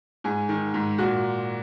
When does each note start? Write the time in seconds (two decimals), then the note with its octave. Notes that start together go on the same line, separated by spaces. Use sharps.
0.24 G#2 G#4
0.49 D#3
0.74 G#2
0.98 A#2 F#4